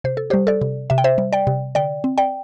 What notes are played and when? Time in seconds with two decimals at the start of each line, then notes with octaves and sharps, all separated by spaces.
0.04 C3 C5
0.17 A4
0.30 G3 G4 C5
0.47 A4 D5
0.61 C3
0.90 C3 E5
0.98 G5
1.04 C5 E5
1.18 G3
1.33 D5 G5
1.47 C3
1.75 D3 D5 G5
2.04 C4
2.18 D5 G5